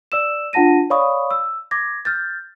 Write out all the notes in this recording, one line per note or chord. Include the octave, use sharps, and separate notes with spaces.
D5 E6 E7
D4 F4 F#5 A5 A#6 D#7
C#5 D5 F5 B5 C#6 D#6
E6
D6 G#6 A#6
F6 G6 A6